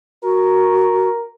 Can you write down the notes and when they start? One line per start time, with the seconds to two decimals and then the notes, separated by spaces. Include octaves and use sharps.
0.23 F#4 A#4